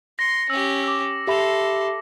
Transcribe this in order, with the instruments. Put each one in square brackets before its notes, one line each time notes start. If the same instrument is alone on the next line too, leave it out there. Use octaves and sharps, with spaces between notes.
[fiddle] C6 [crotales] A#6 C#7
[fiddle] C#4 G4 [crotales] E6
[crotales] D6 E6
[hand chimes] G4 E5 B5 [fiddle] A4 C6